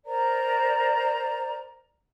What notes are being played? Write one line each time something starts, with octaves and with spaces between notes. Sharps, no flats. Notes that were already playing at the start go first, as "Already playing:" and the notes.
A#4 C5 D5 A#5